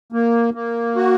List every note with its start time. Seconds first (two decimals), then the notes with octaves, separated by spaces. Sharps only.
0.12 A#3
0.54 A#3
0.96 F#4